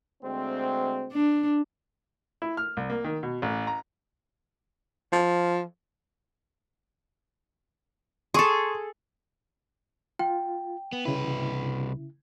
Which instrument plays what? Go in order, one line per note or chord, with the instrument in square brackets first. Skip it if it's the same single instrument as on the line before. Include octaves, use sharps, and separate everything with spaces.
[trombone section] D2 G#3 C4
[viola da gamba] D4
[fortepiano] E4
F6
C2
A#3
D#3
B2
A1
A#5
[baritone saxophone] F3
[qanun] G#4 A4 [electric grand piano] C6 C#6 D#6
[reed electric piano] F4 [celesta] G5
[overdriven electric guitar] B3
[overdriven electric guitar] C2 B4 [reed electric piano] C#3 E4